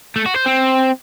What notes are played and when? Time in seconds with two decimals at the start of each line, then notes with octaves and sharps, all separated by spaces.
0.16 A3
0.26 F#4
0.36 C5
0.46 C4